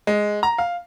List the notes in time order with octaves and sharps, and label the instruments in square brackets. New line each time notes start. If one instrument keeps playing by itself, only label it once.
[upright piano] G#3
A#5
F5